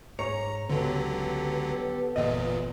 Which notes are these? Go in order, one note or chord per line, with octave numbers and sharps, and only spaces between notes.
G#2 C#5 A#5
C#2 D3 F#3 B3 G4 A4
G1 E2 A#2 B3 D#5